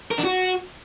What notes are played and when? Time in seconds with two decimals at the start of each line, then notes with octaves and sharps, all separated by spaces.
0.11 A#4
0.18 D4
0.24 F#4